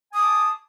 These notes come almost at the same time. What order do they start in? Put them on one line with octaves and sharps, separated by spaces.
G#5 D#6 D6 A5